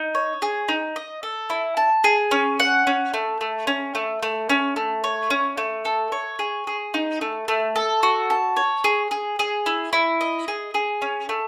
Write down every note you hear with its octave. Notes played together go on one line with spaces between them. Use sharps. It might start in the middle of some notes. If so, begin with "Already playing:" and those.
Already playing: D#4
C#5
G#4
D#4
D#5
A4
E4
A5
G#4
C#4
F#5
C#4
A3
A3
C#4
A3
A3
C#4
A3
C#5
C#4
A3
A4
C#5
G#4
G#4
D#4
A3
A3
A4
F#4
A5
C#5
G#4
G#4
G#4
E4
E4
D#5
G#4
G#4
C#4
A3